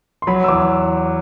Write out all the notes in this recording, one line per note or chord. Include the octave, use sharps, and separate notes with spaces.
C6
F#3 B5
E6
E2 D6